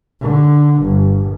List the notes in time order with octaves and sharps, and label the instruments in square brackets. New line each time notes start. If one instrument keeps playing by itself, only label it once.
[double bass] D3
G1